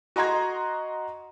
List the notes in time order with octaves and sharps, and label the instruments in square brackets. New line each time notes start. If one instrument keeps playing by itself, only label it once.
[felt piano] F#4 D#5 A#5 C6 G#6